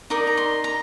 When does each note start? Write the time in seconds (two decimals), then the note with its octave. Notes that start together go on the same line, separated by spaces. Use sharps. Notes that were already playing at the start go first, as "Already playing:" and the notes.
0.10 D#4 A#4 D5 D#6
0.27 A#5
0.37 C6
0.64 A#5